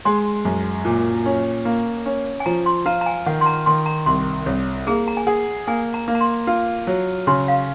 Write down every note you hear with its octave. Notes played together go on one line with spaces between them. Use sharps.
G#3 C6
F#2
A#2
C#4
A#3
C#4
G#5
F3 A#5
C6
F4 A#5
A#5
G#5
D#3 F#5
C6
A#5
D#3 C6
A#5
C2 C6
C2 C#5
A#3 G#4
A#5
G#5
G#4 F#5
A#3 G#5
A#5
A#3
A#5
C6
F4
F#3
C#3 C6
F5